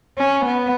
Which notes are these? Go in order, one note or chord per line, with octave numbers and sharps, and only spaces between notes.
C#4
B3